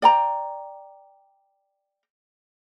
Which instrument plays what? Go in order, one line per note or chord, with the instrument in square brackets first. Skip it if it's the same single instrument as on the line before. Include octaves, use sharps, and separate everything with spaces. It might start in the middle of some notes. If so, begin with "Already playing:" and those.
[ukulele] D5 G5 A#5